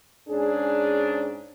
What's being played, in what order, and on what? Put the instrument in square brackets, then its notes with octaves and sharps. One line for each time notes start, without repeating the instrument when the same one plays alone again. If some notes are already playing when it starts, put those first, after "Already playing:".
[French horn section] G#2 C#4 D4 G#4